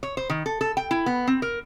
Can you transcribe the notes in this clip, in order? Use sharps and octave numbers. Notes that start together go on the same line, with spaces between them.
C#5
C5
D#3
A4
A4
G5
E4
B3
C4
A#4